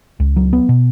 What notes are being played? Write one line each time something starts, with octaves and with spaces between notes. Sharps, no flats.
C#2
F#3
B3
B2